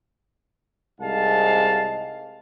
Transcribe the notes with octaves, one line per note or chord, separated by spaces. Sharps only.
C2 G#2 G#3 F5 A5